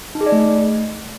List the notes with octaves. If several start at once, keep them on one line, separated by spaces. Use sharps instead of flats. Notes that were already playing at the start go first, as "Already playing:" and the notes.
D#4
G#4
D5
A3